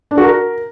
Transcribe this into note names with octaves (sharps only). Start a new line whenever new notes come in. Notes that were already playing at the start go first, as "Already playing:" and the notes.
D4
F#4
A#4